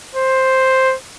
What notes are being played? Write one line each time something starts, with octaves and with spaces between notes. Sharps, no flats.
C5